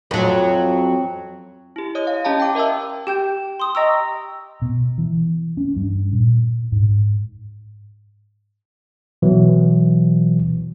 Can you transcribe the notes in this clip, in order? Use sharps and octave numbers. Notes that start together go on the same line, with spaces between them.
F2 F#3
E4 G4
C#5 D#5 D#6
F5
C#4 G4 D#5 F5 A5 A#5
G5 D6
A#4 D#5 E5 A5 E6
G4 G5 G6
C6 D#6
D#5 G5 A#5 C#6 E6
B2
E3
C#4
G2
A#2
G#2
B2 E3 F#3